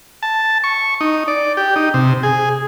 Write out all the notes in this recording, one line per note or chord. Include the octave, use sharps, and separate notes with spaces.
A5
C#6
D#4
D5
G4
D#4
C3
G#4